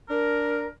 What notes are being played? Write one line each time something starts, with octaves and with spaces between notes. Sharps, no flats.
D4 A#4